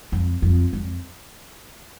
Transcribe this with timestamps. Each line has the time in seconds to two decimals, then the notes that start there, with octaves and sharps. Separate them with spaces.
0.12 F2
0.42 F2
0.73 F2